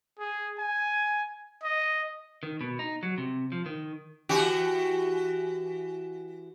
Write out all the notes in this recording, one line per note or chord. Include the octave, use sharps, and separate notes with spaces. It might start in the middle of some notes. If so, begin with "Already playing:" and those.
G#4
G#5
D#5
D#3
B2
D#4
F#3
C3
F3
D#3
E3 F#4 G4